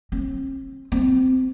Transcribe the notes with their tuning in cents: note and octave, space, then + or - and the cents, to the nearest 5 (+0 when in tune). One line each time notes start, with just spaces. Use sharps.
C4 +45
C4 -20